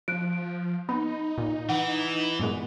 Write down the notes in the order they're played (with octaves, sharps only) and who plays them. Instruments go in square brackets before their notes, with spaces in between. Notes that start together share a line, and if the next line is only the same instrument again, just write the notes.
[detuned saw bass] F3 [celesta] F#6 D7
[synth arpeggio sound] B3 [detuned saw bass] D#4 [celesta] B5
[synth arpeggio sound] A#2
[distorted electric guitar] E3 [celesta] F#5
[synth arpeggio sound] G2 A#2 G#3 [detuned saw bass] B3